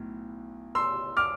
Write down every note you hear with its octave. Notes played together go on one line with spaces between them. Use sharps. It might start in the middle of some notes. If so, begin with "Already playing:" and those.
Already playing: B1 A2
C6 E6
D6 F6